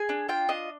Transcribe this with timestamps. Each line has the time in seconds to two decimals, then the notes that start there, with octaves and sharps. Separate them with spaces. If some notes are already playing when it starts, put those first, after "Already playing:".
Already playing: G#4 G#5
0.09 D4
0.29 F4 G5
0.49 D4 D#5